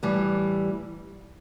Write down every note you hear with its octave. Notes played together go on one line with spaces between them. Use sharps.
A2 E3 G3